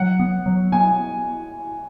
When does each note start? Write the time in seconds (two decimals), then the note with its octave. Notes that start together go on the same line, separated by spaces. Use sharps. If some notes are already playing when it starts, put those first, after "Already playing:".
Already playing: F#3 F#5
0.19 B3
0.46 F#3
0.72 B3 G#5